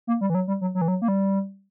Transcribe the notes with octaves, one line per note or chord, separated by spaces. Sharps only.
A#3
G3
E3
F#3
G3
F#3
F#3
E3
F#3
A#3
G3